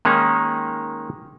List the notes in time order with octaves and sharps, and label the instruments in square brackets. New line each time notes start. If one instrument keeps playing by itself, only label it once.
[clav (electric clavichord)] D#3 G#3 A#3 C#4 D#4